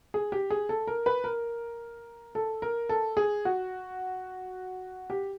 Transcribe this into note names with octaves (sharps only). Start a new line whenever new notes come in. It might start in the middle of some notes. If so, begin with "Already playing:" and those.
G#4
G4
G#4
A4
A#4
B4
A#4
A4
A#4
A4
G#4
F#4
G4